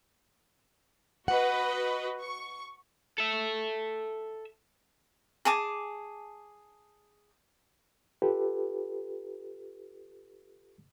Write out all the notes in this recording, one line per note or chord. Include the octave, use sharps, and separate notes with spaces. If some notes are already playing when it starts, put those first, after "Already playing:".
F#4 B4 D#5 F#5
C#6
A4 E5
G#4 G#5 A5 D6
F4 G4 A4 B4